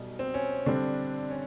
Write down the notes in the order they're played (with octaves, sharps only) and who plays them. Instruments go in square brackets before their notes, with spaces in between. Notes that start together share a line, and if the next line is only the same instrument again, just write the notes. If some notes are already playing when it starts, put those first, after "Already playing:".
Already playing: [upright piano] B1 B2 G3
[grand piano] C4
C#4
[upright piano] D3 G3 C4 [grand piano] D4
[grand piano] C#4